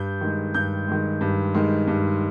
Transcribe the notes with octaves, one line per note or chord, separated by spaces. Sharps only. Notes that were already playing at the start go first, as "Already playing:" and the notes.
Already playing: G2 G6
D#3 G#3
G2 G6
D#3 G#3
G2
D#3 G#3
G2